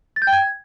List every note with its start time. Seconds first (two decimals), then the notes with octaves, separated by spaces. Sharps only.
0.16 A6
0.22 G6
0.27 G5
0.33 G#6